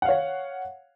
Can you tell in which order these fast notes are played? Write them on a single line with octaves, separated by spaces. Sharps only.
F#5 F5 C#5